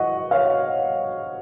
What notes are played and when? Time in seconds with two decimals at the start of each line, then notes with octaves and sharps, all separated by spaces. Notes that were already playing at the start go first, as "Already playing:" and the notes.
Already playing: D#5 F#5 C#6
0.31 C#5 F5